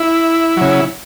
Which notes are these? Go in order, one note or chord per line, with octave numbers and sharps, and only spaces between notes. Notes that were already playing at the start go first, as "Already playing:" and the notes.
Already playing: E4
C#3 F#3